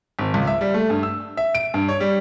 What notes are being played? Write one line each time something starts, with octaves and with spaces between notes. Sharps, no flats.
G#1
C#2
E5
G3
A3
G2
E6
E5
D7
G2
C#5
G3